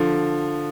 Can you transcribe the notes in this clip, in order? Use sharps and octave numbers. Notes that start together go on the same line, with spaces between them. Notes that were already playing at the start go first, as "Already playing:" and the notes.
Already playing: D3 F3